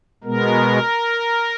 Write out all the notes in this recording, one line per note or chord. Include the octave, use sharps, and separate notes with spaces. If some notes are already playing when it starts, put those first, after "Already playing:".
B2 G#3 B3 A#4